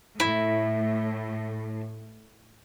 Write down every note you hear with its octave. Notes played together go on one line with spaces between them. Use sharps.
A2 E4